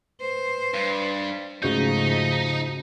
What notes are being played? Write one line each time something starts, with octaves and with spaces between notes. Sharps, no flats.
B4 C5
G2
G#2 C#3 F3 A3 D#4 F#4 G6